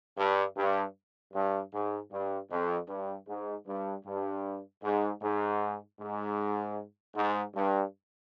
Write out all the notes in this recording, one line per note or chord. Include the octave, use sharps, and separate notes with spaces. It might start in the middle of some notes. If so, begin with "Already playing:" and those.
G2
G2
G2
G#2
G2
F2
G2
G#2
G2
G2
G#2
G#2
G#2
G#2
G2